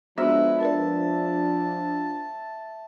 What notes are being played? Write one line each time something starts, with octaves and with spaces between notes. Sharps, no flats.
F3 G#3 B3 D4 F#4 B4 E5
A#4 B4 D5 A5